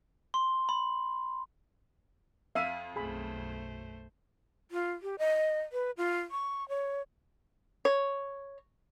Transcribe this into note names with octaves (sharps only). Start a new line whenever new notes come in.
C6
B5
F2 E5 F5 D#7
B1 F#2 A3 G#4 C5 B5
F4
G4
D#5
B4
F4
C#6
C#5
C#5